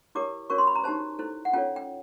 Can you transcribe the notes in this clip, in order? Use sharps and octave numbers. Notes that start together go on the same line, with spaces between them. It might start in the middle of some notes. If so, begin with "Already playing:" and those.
E4 G4 A#4 C#5 D6
C#4 F#4 A#4 C#5 C#6
C6
B5
A#5
D#4 G4 C5 A5
E4 A4 C5
F#5
C#4 F4 A4 C#5 G5
G5